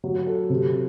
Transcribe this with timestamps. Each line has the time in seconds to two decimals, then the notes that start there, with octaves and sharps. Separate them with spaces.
0.04 F#3
0.26 A4
0.50 C3